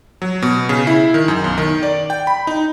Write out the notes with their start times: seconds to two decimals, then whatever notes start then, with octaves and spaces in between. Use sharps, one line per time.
0.22 F#3
0.42 B2
0.69 C#3
0.87 E4
1.14 D#3
1.28 F#2
1.44 B1
1.58 D#3
1.83 D5
2.10 G5
2.27 B5
2.47 D#4